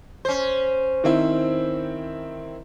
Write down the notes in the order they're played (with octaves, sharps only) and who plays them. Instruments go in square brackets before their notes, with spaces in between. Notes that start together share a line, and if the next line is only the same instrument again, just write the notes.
[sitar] C#4 C5
[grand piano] D#3 C4 E4